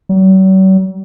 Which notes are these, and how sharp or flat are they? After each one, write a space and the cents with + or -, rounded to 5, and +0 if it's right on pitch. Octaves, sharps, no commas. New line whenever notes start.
F#3 +45